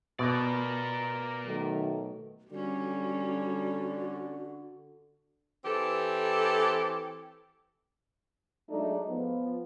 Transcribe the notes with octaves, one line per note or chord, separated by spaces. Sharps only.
B2 A#4 D5
D#3 F#3 A3
D3 G3 C#4 F#4
E3 C4 G4 A4
F#3 G#3 A3 D4 D#4
F3 B3